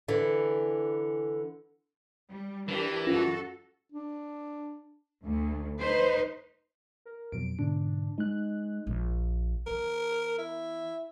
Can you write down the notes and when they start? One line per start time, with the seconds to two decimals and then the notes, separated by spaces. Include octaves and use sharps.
0.08 D3 E3
2.29 G3
2.68 E3 D4 G4 A#4
3.07 F#2 C#4 F4 F#4 A4 A#6
3.92 D4
5.25 D2
5.79 D#4 B4 C5
7.06 A#4
7.32 F2 B2 F#3 D7
7.59 G#2 B2 D3 D4
8.18 G#3 D#4 F#6
8.87 A#1
9.67 E3 B3 A#4
10.38 E4